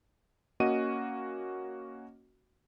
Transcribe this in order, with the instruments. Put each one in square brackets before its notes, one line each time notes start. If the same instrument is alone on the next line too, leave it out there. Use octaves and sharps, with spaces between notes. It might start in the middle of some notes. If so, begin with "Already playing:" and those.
[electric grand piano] A#3 C#4 F#4 D#5 D#7